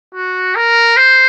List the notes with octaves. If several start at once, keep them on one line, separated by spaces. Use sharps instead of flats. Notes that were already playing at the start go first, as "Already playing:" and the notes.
F#4
A#4
C5